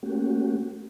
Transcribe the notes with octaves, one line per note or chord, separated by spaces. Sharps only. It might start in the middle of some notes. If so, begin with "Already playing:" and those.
A3 A#3 C#4 F#4 G4